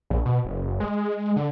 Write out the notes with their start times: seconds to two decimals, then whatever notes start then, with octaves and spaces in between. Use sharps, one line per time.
0.10 A#1
0.26 B2
0.45 F#1
0.80 G#3
1.36 D3